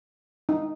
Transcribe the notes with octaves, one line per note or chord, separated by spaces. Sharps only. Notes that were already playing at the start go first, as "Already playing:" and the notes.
D#4